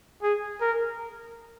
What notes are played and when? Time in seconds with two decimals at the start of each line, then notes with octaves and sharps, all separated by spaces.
0.22 G#4
0.61 A#4